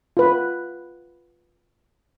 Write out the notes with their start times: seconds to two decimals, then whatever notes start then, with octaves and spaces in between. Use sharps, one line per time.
0.17 F4 B4